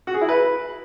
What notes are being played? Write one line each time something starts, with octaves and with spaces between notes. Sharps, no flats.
F#4
G#4
E4
B4